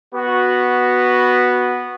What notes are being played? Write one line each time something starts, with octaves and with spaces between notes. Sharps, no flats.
B3 F#4